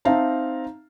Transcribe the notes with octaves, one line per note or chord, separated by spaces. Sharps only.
C4 D#4 E5 F5 A5 A#5